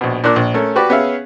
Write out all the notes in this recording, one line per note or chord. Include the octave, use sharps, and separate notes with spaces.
A#1 B2
A#2 D4 A#4 D5 F#6
A#1
A3 C#4 A#4
F#4 G4 B4 D5
B3 C#4 G#4 E5 F5